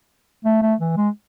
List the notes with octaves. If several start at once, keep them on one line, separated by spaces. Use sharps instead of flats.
A3
A3
E3
G#3